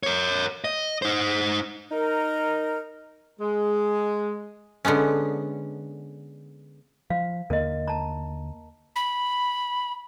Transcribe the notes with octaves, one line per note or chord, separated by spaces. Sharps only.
A#4 C#5
D#5
D#4 C5
D#4 A#4
G#3
D3 G#3 B3 C#4
F3 F5
D#2 D3 A#3 A#4 D#5
A5 A#5
B5